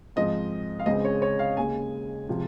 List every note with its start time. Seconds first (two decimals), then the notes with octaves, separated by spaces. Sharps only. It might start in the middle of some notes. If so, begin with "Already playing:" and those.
0.16 G#2 F3 G#3 C4 D#5
0.79 F5
0.86 C#2 C#3 G#3 C4 D#5
1.05 C#5
1.22 C#5
1.39 F5
1.57 D#2 C#3 G#3 G#5
2.27 C3 F3 G#3